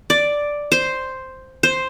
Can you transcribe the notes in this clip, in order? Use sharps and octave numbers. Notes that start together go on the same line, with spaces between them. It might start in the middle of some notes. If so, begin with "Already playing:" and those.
D5
C5
C5